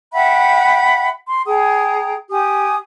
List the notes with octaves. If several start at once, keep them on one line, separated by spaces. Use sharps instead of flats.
E5 F#5 G5 B5
C6
G#4 G5 A#5 D#6
G4 G#5 D#6